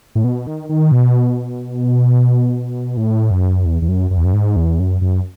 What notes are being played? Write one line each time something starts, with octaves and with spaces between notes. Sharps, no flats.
A2
B2
D#3
D#3
B2
A2
F#2
E2
E2
F#2
F#2
E2
F#2
G#2
E2
F#2
F#2